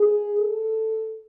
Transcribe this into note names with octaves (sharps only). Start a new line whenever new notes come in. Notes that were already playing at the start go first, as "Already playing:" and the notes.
Already playing: G#4
A4